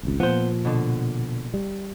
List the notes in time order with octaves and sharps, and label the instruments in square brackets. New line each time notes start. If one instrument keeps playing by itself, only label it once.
[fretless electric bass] G#1 C#2
[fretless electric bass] A#2 F3 [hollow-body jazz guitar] B3 C5
[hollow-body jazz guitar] B2 D3
[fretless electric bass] G3